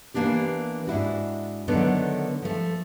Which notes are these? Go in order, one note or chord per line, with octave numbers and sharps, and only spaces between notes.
E3 F#3 A#3 B3 D4 G4
G#2 D4 E4 F#4
D3 D#3 F#3 A3 B3 D4
F3 A3